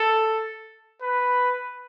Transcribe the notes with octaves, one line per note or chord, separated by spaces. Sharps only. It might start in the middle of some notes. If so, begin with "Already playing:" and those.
Already playing: A4
B4